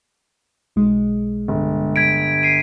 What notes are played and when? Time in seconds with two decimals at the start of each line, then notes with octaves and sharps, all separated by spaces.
0.76 B1 G#3
1.48 G1
1.96 G#6 B6 D7
2.43 C7 D#7